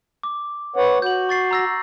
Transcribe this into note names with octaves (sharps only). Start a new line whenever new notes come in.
D6
B4 C#5 F#5
F#4 G6 F#7
C#6 A6 C7
A#5 E6 A#6